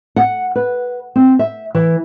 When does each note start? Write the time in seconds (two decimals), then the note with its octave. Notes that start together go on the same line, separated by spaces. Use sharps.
0.16 F#5
0.56 B4
1.16 C4
1.39 E5
1.75 E3